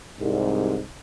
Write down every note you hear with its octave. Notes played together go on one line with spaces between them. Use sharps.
C2 G#2